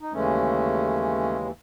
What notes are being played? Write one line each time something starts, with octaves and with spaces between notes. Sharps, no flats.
D#4
D#2 C#3 E3 G#3 A3 C#4
A3